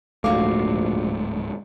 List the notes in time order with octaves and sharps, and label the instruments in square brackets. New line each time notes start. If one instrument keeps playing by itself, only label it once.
[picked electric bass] D1 G#2 [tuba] A#1 [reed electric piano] A3 D6 [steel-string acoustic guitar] F#4 F5